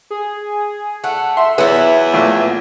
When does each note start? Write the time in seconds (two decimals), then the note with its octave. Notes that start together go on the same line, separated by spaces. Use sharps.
0.10 G#4
1.04 A3 F#5
1.37 E5 C6
1.58 E2 F#3 B3 E4 F#5
2.14 A#1 A3